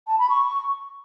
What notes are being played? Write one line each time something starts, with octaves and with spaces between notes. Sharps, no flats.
A5
B5
C#6